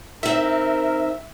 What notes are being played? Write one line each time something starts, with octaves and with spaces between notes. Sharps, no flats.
C4 D#4 A#4 E5